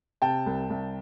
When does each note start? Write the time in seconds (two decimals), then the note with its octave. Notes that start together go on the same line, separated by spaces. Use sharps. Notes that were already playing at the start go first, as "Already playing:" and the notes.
0.22 C3 G5 A5
0.46 C2
0.70 C2